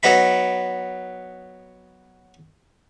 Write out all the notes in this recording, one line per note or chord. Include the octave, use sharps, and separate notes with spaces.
F#3 B3 D#4 B5